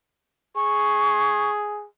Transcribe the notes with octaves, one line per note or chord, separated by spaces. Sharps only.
G#4 C#6